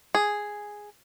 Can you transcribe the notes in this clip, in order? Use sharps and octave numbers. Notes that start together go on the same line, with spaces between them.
G#4